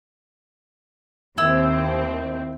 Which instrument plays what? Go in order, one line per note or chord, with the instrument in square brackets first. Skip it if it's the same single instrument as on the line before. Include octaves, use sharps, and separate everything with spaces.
[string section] D#2 C4 [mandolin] E4 E6